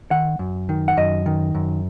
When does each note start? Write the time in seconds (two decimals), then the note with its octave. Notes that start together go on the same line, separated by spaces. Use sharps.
0.11 D#3 F#5
0.39 F#2
0.69 D#3
0.88 F#5
0.97 F#2 D#5
1.26 D#3
1.55 F#2